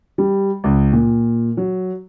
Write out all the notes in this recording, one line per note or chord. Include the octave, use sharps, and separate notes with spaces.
G3
C#2
A#2
F#3